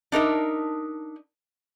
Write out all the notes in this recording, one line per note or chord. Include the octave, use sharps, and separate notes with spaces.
D4 D#4 A#4 E5